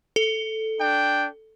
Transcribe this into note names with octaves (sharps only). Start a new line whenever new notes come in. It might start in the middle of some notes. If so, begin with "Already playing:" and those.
A4
D4 G5